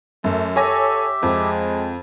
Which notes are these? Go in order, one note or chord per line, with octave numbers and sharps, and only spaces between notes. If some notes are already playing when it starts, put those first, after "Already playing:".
F#2 A3
G4 A4 C#5 E5 G#5 A#6
F2 G#3